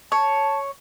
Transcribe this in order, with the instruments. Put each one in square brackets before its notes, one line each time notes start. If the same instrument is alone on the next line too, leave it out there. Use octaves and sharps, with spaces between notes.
[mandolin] C#5 [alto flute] A5